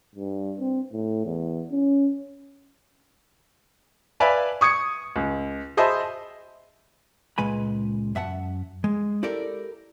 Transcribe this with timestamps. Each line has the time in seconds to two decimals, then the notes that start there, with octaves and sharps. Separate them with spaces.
0.15 G2
0.59 C4
0.93 A2
1.25 E2
1.71 C#4
4.20 B4 D5 E5 F5 G#5 B5
4.61 C#6 D#6 G#6 C#7
5.16 C#2
5.77 G#4 C5 D#5 E5 A5 B5
7.38 C#2 A#2 G#3 B4 G#5 B5
8.15 F#2 E5 F#5 A5
8.84 G#3
9.23 E4 G4 A4 A#4 D5